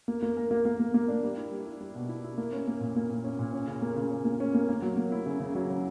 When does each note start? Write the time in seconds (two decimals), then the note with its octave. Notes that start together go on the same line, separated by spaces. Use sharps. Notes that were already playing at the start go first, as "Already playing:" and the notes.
0.08 A#3
0.23 A#3
0.37 A#4
0.51 A#3
0.65 A#3
0.80 A#3
0.94 A#3
1.08 D4
1.23 G3
1.38 E4
1.51 G3
1.66 E4
1.81 G3
1.95 B2
2.09 E4
2.24 E4
2.38 A#3
2.53 C#4
2.68 A#3
2.81 A#2
2.96 A#3
3.10 A#2
3.24 C#4
3.39 A#2
3.53 C#4
3.68 C#3
3.82 A#3
3.96 C#3
4.11 C#3
4.25 A#3
4.40 C#4
4.55 A#3
4.69 A#3
4.82 F#3
4.97 A#3
5.12 E4
5.26 C#3
5.40 C#3
5.55 F#3
5.70 C#3